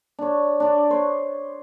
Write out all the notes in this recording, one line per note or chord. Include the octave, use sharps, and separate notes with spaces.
D4 C#5
D4 D5
C5 C#5